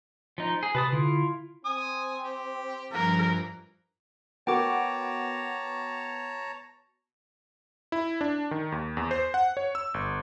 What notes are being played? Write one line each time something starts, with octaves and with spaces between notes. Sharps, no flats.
F3 D#4
G#4
C3 B4 A5 D#6
D3 E4 F4
C4 G#5 D#6
G4
G2 E3 F3 A#4
B3 F#4 A#4 C#5 G5 A5 A#5 D6
E4
D4
D#3
D#2
E2
C5
F#5
C#5
E6
G1